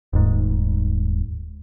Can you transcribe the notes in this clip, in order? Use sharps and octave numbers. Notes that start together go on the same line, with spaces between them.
D#1 G#2